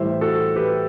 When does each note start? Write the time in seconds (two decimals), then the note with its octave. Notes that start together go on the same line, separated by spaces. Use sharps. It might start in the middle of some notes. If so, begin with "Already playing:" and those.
Already playing: A2 E3 G3 C5 E5
0.21 F#4 A4
0.56 G4 B4